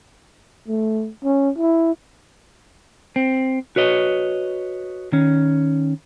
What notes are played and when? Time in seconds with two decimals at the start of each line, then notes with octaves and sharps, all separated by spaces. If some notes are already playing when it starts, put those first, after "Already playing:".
0.68 A3
1.24 C#4
1.57 E4
3.16 C4
3.76 F#4 B4 C#5 D#5
5.12 D#3 C#4